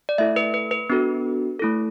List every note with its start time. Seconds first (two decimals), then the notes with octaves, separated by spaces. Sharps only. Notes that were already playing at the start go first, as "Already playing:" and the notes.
0.09 D5
0.18 A3 E4 A4 E5
0.36 B4
0.54 B4
0.71 B4
0.90 B3 D4 F#4 A4
1.60 A3 E4 A4